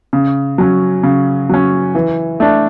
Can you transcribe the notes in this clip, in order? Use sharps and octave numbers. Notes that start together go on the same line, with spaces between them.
C#3
F#3 C#4
C#3
F#3 C#4
E3
A3 D4